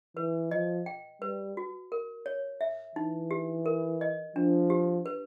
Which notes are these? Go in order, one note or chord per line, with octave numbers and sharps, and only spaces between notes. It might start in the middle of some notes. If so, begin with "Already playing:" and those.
E3 B4
F3 D#5
G5
G3 B4
F#4
A#4
C#5
E5
E3 D#4
G4
A#4
D#5
F3 D4
G4
B4